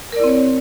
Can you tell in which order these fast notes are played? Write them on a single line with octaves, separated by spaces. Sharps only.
A#4 D5 E4 C4 C#5